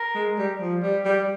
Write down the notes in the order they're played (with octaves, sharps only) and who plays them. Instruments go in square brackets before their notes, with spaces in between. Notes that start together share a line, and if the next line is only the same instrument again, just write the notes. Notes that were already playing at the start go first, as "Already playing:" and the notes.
Already playing: [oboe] A#4
[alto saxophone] G#3
G3
F3
G3
G3